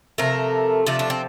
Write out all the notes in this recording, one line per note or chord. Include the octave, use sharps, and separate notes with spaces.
C3 F3 A3 A#4
C3 F3 A3 D4
D4
C4